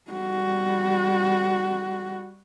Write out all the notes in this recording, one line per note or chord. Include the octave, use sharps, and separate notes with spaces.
G3 F#4